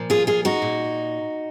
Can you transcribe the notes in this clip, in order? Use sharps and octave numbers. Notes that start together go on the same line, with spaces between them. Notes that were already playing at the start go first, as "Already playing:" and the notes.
Already playing: A#2 F3
F4 G#4
F4 G#4
D#4 F#4
A#2